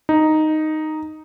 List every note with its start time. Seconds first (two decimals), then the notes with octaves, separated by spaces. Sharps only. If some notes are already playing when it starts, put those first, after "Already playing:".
0.09 D#4